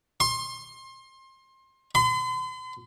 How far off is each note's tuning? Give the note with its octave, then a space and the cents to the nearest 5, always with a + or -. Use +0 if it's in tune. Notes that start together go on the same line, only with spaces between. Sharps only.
C6 +25
C6 -45